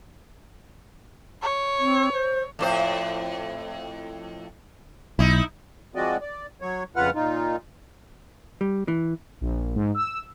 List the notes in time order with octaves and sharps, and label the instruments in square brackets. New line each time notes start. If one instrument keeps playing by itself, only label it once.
[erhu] C#5
[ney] C4
C5
[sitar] F2 A2 C5
[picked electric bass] B1 [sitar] D#4 E4
[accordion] F3 G#3 C4 F#4 D5 D#5
D5
F#3 C#5
F2 C#3 F4 B4 F#5 F6
A#2 D#4 F4
[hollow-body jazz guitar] G3
E3
[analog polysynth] A#1
G#2
E6